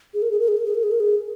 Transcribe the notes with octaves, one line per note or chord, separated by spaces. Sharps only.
G#4
A#4
G#4
A#4
G#4
A#4
G#4
A#4
G#4
A#4
G#4